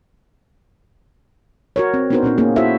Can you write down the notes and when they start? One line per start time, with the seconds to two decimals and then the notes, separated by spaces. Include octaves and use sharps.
1.76 F#4 A#4 C#5
1.94 C4
2.10 B3 D4 D#4 F#4 A#4 C5
2.23 A#2 C4 C#4 D#4
2.38 A#3 C#4 G#4
2.56 E4 F#4 A4 C5 C#5 E5